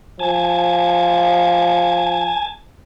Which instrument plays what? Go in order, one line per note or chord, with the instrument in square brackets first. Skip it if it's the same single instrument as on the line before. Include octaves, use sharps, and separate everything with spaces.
[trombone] F3 [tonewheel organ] G#5 A5